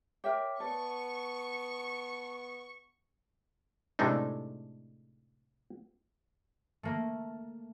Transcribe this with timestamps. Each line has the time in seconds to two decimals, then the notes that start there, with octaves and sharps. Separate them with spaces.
0.24 A#4 C#5 E5 G5 D6
0.60 B3 D5 A5 C#6
3.99 A2 C3 G#3 A3 D4 D#4
6.83 A3 A#3